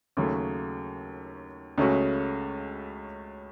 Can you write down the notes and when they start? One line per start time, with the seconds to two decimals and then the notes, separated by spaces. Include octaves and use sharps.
0.17 D#2 C#3 F#3 A3
1.78 C#2 C#3 A3 C#4 F#4